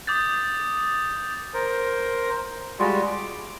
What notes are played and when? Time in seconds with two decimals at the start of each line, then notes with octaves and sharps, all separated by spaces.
0.07 D6 D#6 G6 A6
1.54 A#4 C5
2.79 G3 G#3 F4 F#4
3.07 D6